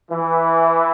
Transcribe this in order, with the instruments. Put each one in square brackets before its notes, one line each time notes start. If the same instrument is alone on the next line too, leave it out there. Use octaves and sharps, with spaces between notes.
[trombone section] E3